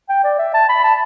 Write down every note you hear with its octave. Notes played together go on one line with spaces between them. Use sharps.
G5
D5
E5
A5
B5
A5